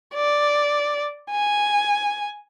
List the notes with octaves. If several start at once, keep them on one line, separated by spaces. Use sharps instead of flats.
D5
G#5